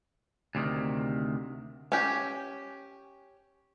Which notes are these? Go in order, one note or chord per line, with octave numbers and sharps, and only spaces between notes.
D2 C3 D#3
C#4 G4